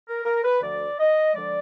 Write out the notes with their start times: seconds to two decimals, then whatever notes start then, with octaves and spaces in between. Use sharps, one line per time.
0.08 A#4
0.25 A#4
0.44 B4
0.62 D2 D3 F3 D5
0.99 D#5
1.34 D3 F3 G#3 D5